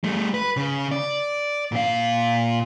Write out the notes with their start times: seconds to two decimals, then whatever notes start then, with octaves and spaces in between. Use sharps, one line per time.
0.04 G3 A3
0.34 B4
0.57 C#3
0.91 D5
1.72 A#2 F5